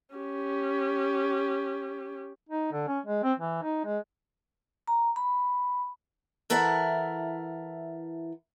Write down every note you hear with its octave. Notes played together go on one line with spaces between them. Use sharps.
C#4 G4
D#4
D3
C#4
G#3
C4
E3
D#4
G#3
A#5
B5
E3 E4 A4 A#4 E5 F#5